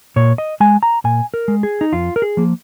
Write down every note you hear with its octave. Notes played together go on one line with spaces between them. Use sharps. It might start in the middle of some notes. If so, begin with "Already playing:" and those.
A#2 C#5
D#5
G#3 G#5
A#5
A#2 G#5
A#4
G#3
G#4
D#4
F2 F4
A#4
G#4
F3 A#3